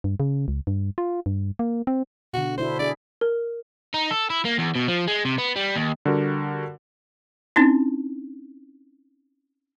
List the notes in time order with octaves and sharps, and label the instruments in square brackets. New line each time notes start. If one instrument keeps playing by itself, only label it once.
[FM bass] G2
C#3
C#2
G2
F4
G2
A#3
C4
[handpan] B2 D3 [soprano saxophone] F#4
[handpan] D4 E4 F#4 [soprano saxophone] C5
[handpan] D4 G#4 [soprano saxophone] D5
[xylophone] A#4
[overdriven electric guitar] D#4
A4
E4
A#3
E2
B2
F3
G#3
C3
B3
G3
D#2
[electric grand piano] D3 G3 F#4 A#4
[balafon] C4 C#4 D#4 E4